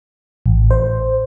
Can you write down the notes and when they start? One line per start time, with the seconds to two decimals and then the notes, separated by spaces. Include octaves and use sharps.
0.46 A1
0.71 C5